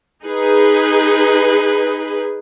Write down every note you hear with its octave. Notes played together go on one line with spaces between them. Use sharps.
D#4 G#4 B4